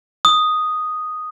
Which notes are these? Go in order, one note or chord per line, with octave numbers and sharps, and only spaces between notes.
D#6